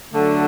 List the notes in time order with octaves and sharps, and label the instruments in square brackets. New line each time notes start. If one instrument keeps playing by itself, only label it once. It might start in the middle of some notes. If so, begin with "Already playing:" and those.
[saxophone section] D3 F#3 A3 D4 A4